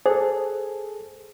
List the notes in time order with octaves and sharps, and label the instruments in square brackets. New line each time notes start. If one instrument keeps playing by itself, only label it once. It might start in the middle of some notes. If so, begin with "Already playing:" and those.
[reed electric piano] G#4 A4 [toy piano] C5